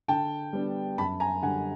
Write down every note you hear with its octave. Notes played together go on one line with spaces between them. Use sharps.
D3 G5 A5
G3 B3 D4
F#2 A5 B5
G#5 A#5
D3 G3 F#5 G#5